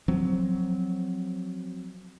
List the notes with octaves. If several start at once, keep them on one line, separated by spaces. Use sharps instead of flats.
F3 F#3 C4